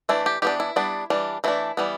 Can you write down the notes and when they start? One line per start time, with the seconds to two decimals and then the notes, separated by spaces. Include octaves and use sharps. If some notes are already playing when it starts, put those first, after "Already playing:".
0.09 E3 A3 D4 E4
0.26 G4
0.42 E3 B3 D4 G4
0.60 E4
0.76 G3 B3 D4
1.10 E3 G3 D4
1.44 E3 A3 D4 E4
1.77 E3 G3 B3